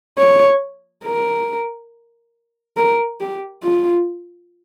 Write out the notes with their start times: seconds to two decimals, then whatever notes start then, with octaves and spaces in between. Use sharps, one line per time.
0.18 C#5
1.05 A#4
2.77 A#4
3.20 G4
3.63 F4